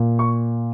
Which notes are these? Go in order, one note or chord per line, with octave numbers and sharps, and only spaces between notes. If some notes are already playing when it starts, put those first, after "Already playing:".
Already playing: A#2
C#6